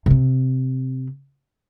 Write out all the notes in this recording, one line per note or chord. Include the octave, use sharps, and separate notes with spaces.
C3 C4